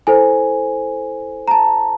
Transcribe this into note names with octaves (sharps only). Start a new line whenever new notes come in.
E4 A4 C5 G#5
A#5
A5